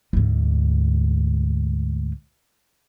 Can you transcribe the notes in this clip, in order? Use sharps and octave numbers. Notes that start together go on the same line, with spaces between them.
D2 G#2